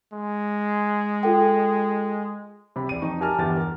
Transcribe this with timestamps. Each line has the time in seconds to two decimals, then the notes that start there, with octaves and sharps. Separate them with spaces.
0.13 G#3
1.23 F4 A4 G5
2.76 C3 B5
2.89 E2 D5 D#7
3.02 F2 D#4 C#6
3.21 G4 A#4 G#5 A5 F6
3.38 G1 E2 G4 A6
3.57 A#4